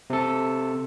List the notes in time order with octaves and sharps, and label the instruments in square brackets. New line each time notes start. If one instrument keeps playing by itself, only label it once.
[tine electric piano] C3 A4